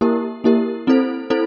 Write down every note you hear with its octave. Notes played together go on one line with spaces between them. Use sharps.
A#3 E4 G4 A#4
A#3 E4 G4 A#4
C4 E4 A4 C5
C4 E4 A4 C5